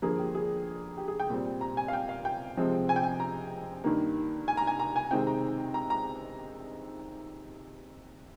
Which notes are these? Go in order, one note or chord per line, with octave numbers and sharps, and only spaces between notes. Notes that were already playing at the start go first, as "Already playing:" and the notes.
G2 D3 F3 A#3 G#4
G4
G#4
G4
G#4
G5
A#2 G3 C4
A#5
G#5
F5
G5
F5
G5
C3 F3 G#3 C4
G#5
G5
G#5
A#5
G2 D#3 A#3
G#5
A#5
G#5
A#5
G#5
C3 D#3 G#3 C4 G5
A#5
A#5
A#5